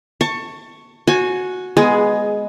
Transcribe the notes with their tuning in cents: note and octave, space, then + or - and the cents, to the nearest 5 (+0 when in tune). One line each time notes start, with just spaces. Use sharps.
A5 +25 C#6 +0
F#4 -10 C#5 -40 G#5 +20
G#3 +0 B3 +0 G#4 +15